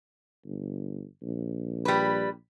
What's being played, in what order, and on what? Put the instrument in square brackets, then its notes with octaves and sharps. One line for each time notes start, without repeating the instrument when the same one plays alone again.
[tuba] G1
A#1
[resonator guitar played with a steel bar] G3 B4